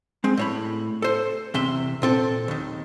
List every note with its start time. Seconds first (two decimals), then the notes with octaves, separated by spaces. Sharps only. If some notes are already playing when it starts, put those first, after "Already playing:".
0.24 G#3 C4
0.37 A2 C#5 B5
1.02 A4 C5
1.54 E2 C3 E5 C6
2.02 A#2 C4 A4
2.48 D#2 D#3